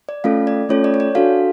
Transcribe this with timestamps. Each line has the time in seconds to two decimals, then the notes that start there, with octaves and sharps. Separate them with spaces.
0.09 D5
0.24 A3 C#4 F4 A4 F5
0.47 D5
0.69 A3 C#4 F4 A4 C#5
0.84 D5
0.94 C#5
1.00 D5
1.15 D4 F#4 A4 F5